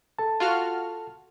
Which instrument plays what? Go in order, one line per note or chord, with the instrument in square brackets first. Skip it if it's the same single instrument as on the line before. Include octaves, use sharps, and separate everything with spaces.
[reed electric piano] A4 A5
[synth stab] F4 F#4 F6